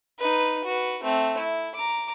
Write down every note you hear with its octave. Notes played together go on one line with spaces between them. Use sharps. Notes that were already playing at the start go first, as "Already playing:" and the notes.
D#4 B4
F#4 B4
A3 C4
E4
A#5 D6